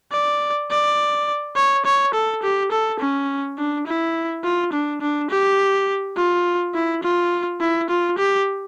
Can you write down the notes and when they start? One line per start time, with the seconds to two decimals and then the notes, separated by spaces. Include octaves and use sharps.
0.12 D5
0.70 D5
1.56 C#5
1.85 C#5
2.14 A4
2.43 G4
2.72 A4
3.00 C#4
3.58 D4
3.87 E4
4.44 F4
4.73 D4
5.01 D4
5.30 G4
6.17 F4
6.74 E4
7.03 F4
7.61 E4
7.89 F4
8.18 G4